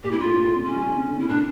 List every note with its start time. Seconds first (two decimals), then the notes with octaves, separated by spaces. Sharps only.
0.03 A#2 G4
0.11 G2 E4
0.20 F4
0.25 A2
0.35 A#2
0.45 A2
0.56 C#3
0.65 C#4
0.76 G3
0.87 D3
0.97 C#3
1.08 D3
1.18 C#3 E4
1.29 A#2 D4